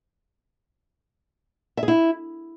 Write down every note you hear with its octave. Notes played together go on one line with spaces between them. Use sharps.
E5
G#4
E4